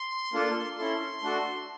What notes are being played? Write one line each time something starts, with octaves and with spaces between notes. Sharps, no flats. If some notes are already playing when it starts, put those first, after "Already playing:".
Already playing: C6
A#3 D4 F4 A4
C#4 E4 A4 C6
A3 D4 F#4 A4